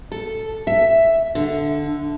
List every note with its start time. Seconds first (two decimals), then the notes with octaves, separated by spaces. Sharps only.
0.12 A4
0.67 E5
1.35 D3